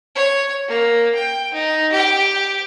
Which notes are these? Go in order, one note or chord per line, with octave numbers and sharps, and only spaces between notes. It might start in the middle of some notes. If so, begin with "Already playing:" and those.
C#5
A#3
G5
D#4
G4 G5